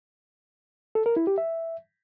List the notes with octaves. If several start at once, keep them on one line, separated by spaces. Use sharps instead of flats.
A4
A#4
E4
G4
E5